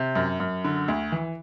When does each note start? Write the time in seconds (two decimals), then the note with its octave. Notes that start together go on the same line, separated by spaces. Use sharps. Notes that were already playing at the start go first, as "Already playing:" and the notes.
Already playing: C3
0.15 F#2
0.40 F#2
0.64 D3
0.88 D2
1.12 E3